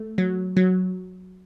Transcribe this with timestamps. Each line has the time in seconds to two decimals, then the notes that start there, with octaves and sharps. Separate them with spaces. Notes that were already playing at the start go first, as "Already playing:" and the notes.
Already playing: A3
0.18 F#3
0.57 F#3